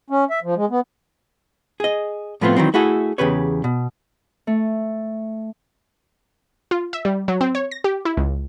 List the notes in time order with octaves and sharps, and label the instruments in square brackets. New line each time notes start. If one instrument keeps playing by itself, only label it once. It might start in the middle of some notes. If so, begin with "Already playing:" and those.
[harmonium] C#4
E5
F3
G#3
B3
[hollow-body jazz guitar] G#4 D#5
A2 F3 A3 B3 C4 F4
D#3 E3 F#3 C4
A3 E4 F#4 G#4 A4
E2 C#3 G4 B4 C#5
B2
[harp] A3
[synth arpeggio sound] F4
E5
G3
F#3
C4
C#5
A#6
G4
E4
C#2